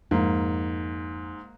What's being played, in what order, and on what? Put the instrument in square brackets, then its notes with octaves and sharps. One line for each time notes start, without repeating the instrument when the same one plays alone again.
[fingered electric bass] F2 [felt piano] G#2 [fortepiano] A#3